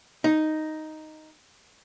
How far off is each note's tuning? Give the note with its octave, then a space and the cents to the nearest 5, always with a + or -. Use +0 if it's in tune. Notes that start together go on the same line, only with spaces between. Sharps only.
D#4 +0